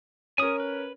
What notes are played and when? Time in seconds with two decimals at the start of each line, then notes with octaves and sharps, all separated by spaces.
0.38 C#4 A#4 G#5 D#6
0.60 B4